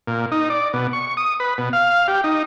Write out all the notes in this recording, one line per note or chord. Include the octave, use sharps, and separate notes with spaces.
A#2
D#4
D5
B2
C#6
D#6
B4
B2
F5
G4
D#4